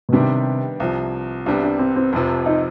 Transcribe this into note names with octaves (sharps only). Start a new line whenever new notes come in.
B2
C3 D#3 G3 B3 D4 G4
C2 C3 F3
C2 C3 G3 B3 D4
D4
C4
C4
F1 F2 C3 F3
D#4